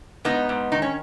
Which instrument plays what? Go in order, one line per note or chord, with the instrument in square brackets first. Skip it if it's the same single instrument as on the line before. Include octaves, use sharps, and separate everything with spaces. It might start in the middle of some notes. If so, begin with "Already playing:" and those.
[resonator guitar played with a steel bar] G#2 B3 D#4
G#2
D#3 D#4
C#4